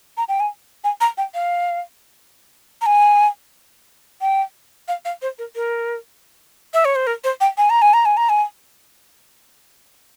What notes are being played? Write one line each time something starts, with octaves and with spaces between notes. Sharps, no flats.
A#5
G5
G#5
G#5
A#5
G5
F5
A#5
G#5
G5
F5
F5
C5
A#4
A#4
E5
C#5
C5
A#4
C5
G5
G#5
A#5
G#5
A#5
G#5
A#5
G#5